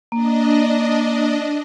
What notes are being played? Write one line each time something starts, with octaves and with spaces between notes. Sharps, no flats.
A#3 D4 D#5